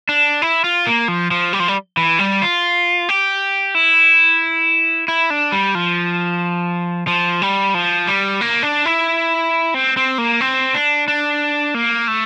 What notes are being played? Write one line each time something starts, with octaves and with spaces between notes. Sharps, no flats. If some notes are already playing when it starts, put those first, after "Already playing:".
D4
E4
F4
A#3
F3
F3
G3
F3
G3
E3
G3
F4
G4
E4
E4
D4
G3
F3
F3
G3
F3
G3
A#3
D4
E4
C4
C4
A#3
C4
D4
D4
A#3
A3